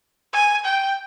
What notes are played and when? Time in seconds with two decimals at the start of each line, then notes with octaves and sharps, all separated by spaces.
0.33 G#5
0.65 G5